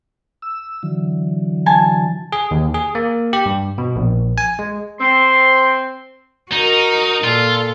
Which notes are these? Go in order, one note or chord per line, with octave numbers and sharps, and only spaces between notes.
E6
D3 E3 F#3
G#5 A5
G#4
D#2
G#4
A#3
G4
G2
B2
A#1
G#5
G#3
C4 C6
D#4 F#4 A#4
A#2 F4 A4